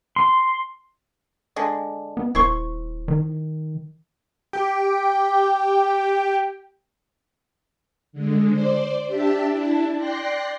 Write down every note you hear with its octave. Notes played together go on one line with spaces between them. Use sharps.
C6
D3 G#3
B3
D#1 E4 C5 C#6
D#3
G4 G5
D3 G#3
C5 D5
D4 G4 E5 A5
D4 E4 A5
D5 G5 C6 F#6 A#6 C7